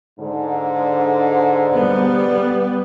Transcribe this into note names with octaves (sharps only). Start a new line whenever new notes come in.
G#2 D3
G3 B3